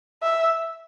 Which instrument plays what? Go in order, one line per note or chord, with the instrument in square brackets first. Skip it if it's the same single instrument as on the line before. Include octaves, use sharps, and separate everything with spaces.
[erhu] E5